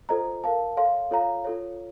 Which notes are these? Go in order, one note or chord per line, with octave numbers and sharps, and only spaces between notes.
F4 A4 C5 D#5 A#5
A#4 F5 A5
A4 C#5 F5 C6
F4 A4 C#5 F5 A#5
F4 A4 C#5